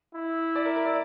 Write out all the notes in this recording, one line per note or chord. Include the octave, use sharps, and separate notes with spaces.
E4
D5
A#4
A#4
D5